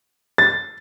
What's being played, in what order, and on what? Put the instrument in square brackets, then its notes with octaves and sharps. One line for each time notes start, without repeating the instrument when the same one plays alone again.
[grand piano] A6